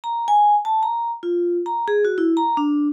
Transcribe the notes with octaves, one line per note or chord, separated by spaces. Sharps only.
A#5
G#5
A5
A#5
F4
A#5
G#4
F#4
E4
A#5
D4